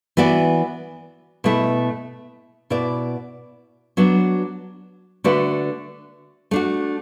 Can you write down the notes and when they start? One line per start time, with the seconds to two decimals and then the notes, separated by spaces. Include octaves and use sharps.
0.17 E3 B3 F#4 D5
1.44 B2 A3 E4
2.70 B2 B3 E4 D5
3.97 F#3 B3 D4 F#4
5.24 D3 A3 F#4 B4 D5
6.51 A3 D4 F#4